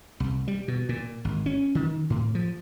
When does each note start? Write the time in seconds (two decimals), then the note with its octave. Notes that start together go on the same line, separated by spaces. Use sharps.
0.20 C2
0.48 G3
0.68 B2
0.89 A#2
1.25 G#1
1.46 C#4
1.75 D#3
2.10 A2
2.35 F3